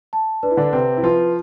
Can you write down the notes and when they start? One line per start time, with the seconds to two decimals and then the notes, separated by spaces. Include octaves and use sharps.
0.13 A5
0.43 D4 B4
0.51 E4
0.57 D3 D4
0.73 C3 C4 B4
0.97 E4
1.03 F3 F4 B4